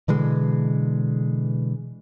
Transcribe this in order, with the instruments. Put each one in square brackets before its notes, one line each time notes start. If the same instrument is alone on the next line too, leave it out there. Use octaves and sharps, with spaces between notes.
[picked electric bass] B2 D3 E3 G#3